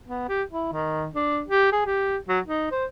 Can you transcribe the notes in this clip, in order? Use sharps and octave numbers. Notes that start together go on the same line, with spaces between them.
B3
G4
E4
D#3
D4
G4
G#4
G4
F#3
D#4
C5